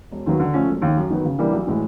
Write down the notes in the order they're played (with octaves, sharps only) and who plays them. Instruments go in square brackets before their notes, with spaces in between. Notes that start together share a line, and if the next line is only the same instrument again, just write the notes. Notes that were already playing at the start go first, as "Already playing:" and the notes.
[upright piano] E1
D#2 D#3 F#3 B3
D3
F3 A3 C#4
E1
D#2
D#3
F#2
D#3 F#3 B3
C#3
E3 G3 A#3 D4
B1
A2 E3 G#3